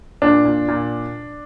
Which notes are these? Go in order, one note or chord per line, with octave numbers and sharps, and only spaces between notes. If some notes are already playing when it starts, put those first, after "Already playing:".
A#2 D4
A#2
A#2